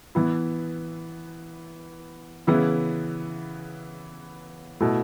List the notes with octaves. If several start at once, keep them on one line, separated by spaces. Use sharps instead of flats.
E3 B3 E4
C#3 E3 B3 E4
B2 A3 E4